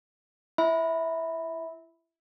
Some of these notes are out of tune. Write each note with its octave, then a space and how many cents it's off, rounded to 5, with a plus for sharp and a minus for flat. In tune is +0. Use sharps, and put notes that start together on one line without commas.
E4 +30 E5 -15 B5 +0